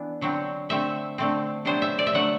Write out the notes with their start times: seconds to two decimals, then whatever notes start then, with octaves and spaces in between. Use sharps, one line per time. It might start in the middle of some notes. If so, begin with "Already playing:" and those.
Already playing: E3 B3 D4
0.21 D3 F#3 C4
0.69 D3 A3 C4 E5
1.18 D3 A3 C4
1.65 C3 F#3 B3 D4 C5
1.82 E5
1.99 D5
2.07 E5
2.13 D3 F#3 A3 F#5